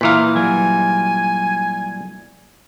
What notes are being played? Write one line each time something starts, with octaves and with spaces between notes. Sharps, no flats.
A#2 E3 B4 F5 A#5
F#3 G3 A#4 G#5